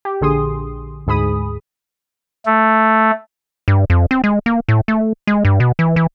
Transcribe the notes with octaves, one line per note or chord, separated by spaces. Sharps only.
G4
A#1 D3 G#4 C6 D#6
D2 G#2 G#4 B5 D#6
A3
G2
F2
C4
G#3
A#3
A2
A3
G#3
G2
B2
E3
E3